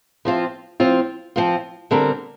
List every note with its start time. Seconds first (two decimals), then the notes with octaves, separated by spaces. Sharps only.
0.25 F3 C4 F4
0.80 F3 C4 F4
1.36 F3 C4 F4
1.91 D3 G3 C4 A#4